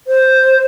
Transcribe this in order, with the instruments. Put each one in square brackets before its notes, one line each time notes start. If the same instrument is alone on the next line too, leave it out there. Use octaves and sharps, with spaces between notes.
[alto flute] C5